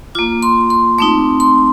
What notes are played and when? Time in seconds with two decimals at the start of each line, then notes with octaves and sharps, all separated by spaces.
0.15 A#3 F4 D6
0.43 C6
0.70 C6
0.98 A3 C4 D#4 D6
1.40 C6